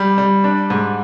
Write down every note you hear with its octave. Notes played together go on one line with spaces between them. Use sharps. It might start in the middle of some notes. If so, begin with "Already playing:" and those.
Already playing: G3
G3
D4
G#2